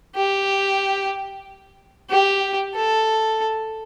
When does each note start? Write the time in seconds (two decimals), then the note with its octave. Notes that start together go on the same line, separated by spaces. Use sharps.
0.16 G4
2.10 G4
2.75 A4